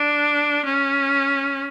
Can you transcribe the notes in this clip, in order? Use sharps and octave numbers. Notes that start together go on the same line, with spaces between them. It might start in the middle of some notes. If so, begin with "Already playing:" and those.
Already playing: D4
C#4